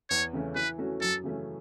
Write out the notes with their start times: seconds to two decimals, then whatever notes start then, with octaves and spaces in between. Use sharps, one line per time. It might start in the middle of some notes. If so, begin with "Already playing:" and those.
0.10 E2 C#5
0.33 C#3 E3 A3 C#4
0.55 E3 B4
0.78 A3 C#4 F#4
1.01 F#2 A4
1.23 C#3 E3 A3 C#4